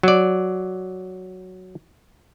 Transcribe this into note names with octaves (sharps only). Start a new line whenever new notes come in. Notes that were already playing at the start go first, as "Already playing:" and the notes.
F#3 D5